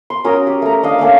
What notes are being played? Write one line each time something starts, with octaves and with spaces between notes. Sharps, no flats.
C6
C#4 F#4 A#4 D#6
G4
A3 A#5
D4 D#5 F5
A3 A#3 C#4 D4